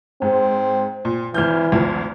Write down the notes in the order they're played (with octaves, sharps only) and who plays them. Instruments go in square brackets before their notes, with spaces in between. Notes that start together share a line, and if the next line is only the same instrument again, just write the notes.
[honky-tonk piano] G#2 [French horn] C4
[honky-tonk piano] A#2
[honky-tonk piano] G#1 F6 G6 [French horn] E3
[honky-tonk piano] G#1 D2 F3